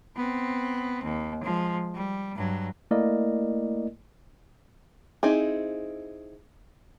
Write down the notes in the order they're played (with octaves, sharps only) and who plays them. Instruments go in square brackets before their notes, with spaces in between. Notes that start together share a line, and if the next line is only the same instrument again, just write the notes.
[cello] B3 C4
D#2
F3 G#3
G3
G2 F#3
[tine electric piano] A3 A#3 E4 A#4 D5 D#5
[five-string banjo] C4 D#4 E4 G#4